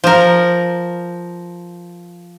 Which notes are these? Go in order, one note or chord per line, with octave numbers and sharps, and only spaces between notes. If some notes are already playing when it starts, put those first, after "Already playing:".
F3 A#4